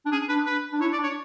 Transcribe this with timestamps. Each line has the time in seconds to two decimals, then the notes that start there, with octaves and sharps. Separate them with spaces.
0.06 D4
0.12 C#4 G#4
0.29 D4 B4
0.46 B4
0.73 D4
0.80 E4 C#5
0.92 D5
0.98 D4
1.04 C#5